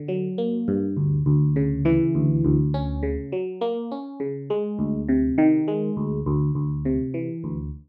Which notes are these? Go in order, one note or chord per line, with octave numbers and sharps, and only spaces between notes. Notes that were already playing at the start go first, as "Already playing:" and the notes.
Already playing: D3
F#3
A#3
G2
D2
D2
C#3
E3
D2
D2
C#4
C#3
F#3
A#3
C#4
C#3
G#3
D2
C3
D#3
G#3
D2
D2
D2
C3
E3
D2